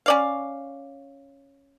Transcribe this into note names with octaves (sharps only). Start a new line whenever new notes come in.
C#4 D5 F5